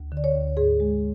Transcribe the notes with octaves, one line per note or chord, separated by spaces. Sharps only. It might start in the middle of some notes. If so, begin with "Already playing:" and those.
Already playing: D2
D3
D5
C#5
D2
G#2 G#4
G#3